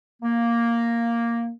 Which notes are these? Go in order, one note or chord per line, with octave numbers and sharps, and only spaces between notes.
A#3